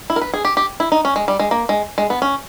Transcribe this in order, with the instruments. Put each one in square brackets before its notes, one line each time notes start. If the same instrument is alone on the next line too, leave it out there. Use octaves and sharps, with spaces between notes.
[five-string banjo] E4
A#4
B4
G#4
G4
G4
E4
D#4
C#4
G#3
G3
G#3
A#3
G#3
G#3
B3
C#4